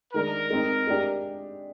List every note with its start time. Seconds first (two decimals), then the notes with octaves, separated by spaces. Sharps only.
0.14 D#3 G#3 D4 A#4
0.50 G#3 C4 D#4
0.87 G#3 D4 G4 D5